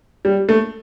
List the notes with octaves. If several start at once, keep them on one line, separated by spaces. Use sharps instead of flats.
G3
A3